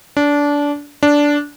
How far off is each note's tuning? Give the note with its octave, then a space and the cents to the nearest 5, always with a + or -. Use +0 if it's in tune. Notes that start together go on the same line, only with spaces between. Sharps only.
D4 -20
D4 -10